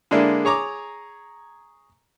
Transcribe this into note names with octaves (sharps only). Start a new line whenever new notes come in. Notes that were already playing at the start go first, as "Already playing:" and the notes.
D3 G#3 A#3 D4 E4
G#4 C#5 A#5 D6